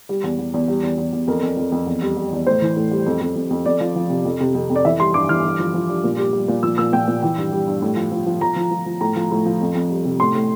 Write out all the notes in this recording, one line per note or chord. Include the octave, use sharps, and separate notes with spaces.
G3
E2
E2
E2
G3
E2
E2
E2
F2 A#4
F2
F2
F2
E2
G3
G3
E2
A2 C5
E3
A2
G3
F2
F2
F2
F2
F2 D5
F3
F3
C3
F2
C3
F2
F2
D5
E3 E5
G3 C6
G2 D6
E3 F6
G2
F3
F3
G2
A#2
G3
G3
A#2
F3 E6
A#2 E6
A#2 G5
A#2
E3 G5
G2
G3
G2
A2
F3
F3
F3
F3 A#5
F3
F3
F3
A2 A#5
F3
A2
F3
F2
F2
G3
C3
A2 C6
A2